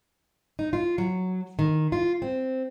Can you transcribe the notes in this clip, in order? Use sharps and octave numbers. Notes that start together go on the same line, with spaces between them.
D#4
F4
F#3
D#3
F4
C4